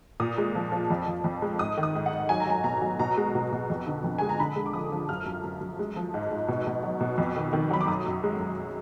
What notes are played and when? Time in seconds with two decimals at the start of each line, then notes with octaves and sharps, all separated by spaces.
0.20 A#2 D#6
0.38 G#3
0.55 F3
0.72 F3
0.90 F2
1.07 F2
1.24 F2
1.42 G#3
1.59 G#2 D#6
1.77 D#3
1.83 D#6
1.95 G#2
2.06 F#5
2.13 G#2
2.29 F#3 G#5
2.40 A#5
2.47 F#3 G#5
2.64 B2 A#5
2.81 F#3
2.99 B2 A#5
3.17 G#3
3.35 B2
3.52 B2
3.70 F2
3.87 D3
4.04 F2
4.18 G#3 G#5
4.29 A#5
4.39 D3 B5
4.56 G#3
4.66 D6
4.73 F3 D#6
4.92 F3
5.09 F#2 F6
5.26 F#2
5.44 F#2
5.61 F#2
5.79 G#3
5.96 F3
6.14 G#2
6.32 G#2
6.48 B2
6.67 B2
6.83 F#3
7.01 B2
7.18 F2
7.36 D#3
7.53 D#3
7.71 F#3 B5
7.81 D6
7.88 F#2 D#6
8.06 F#2
8.23 G#3
8.40 F#2